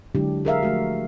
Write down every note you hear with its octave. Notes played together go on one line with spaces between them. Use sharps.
D3 F#3 G#3 D4 E4 G4
G#4 A#4 E5 F5
F3 A3 F#4